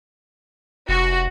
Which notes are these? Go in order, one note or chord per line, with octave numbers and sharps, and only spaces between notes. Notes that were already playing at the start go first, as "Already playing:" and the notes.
F1 F#4